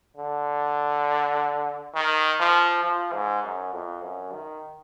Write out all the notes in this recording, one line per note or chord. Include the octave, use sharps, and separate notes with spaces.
D3
D#3
F3
F3
G#2
F#2
F2
F#2
D#3